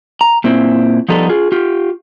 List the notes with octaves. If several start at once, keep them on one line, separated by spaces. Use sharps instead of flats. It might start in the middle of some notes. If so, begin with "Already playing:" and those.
A#5
A#2 C4 E4
F3 G3 B3 D#4 A4
F4 G#4
F4 G4